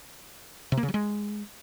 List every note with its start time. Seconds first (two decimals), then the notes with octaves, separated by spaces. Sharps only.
0.72 C3
0.77 A#3
0.83 C#3
0.88 F#3
0.94 G#3